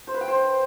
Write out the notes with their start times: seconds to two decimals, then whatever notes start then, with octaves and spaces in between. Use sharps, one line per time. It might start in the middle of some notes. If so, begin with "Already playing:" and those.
0.07 C5
0.14 B4
0.21 G5
0.28 C5